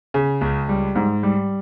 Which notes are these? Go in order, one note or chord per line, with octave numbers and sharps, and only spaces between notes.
C#3
C#2
G3
G#2
G3